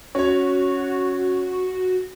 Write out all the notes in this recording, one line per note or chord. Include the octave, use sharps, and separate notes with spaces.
C#4 F#4 C#5